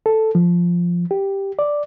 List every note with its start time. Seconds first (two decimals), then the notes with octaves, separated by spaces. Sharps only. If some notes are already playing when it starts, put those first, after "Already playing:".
0.06 A4
0.35 F3
1.11 G4
1.59 D5